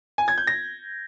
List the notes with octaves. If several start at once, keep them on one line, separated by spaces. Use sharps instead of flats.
G#5
G#6
G6
A#6